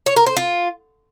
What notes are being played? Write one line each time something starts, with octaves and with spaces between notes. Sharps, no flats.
C#5
A#4
C5
F4